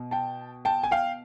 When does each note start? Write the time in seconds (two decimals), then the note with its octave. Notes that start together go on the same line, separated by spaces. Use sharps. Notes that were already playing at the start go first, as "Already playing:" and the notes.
Already playing: B2
0.11 G5 A5
0.65 G5 A5
0.84 G#5
0.91 F5 G5